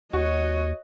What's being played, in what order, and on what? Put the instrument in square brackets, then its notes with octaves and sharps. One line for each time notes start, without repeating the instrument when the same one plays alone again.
[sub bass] D#2 [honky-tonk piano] F#4 [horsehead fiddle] C#5 D#5